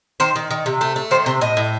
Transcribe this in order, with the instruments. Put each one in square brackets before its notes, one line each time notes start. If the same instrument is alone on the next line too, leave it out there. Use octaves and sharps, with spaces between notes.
[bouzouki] D#3 C5
D#3
D#3
C3
A3
A3
D#3 C5
C3 C5
A2 D#5
A2